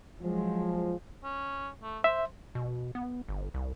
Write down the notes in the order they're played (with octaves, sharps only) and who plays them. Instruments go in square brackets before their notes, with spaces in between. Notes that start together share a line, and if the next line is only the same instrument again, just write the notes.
[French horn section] F3 [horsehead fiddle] F#3 G#3
[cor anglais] C#4
A3
[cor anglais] C5 [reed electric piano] E5
[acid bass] B2
B3
G1
C2